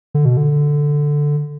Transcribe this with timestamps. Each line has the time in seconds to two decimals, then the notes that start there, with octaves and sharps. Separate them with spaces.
0.14 D3
0.25 B2
0.37 D3